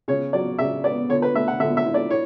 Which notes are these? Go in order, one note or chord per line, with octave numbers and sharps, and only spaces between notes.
C#3 C#5
F#3 D5
C#3 E5
B3 D5
D3 C#5
B4
A3 E5
F#5
D3 E5
E5
E4
D5
E4 C#5